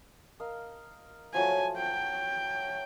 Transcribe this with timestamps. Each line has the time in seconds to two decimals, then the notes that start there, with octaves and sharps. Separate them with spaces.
0.40 A#4 D#5 F5
1.34 F3 F#3 A3 G#5
1.77 F#5 G5